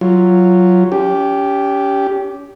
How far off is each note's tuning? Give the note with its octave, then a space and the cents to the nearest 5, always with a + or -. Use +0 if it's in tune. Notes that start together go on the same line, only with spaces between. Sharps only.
F#3 +0 F4 -5
C#4 +35 G4 +0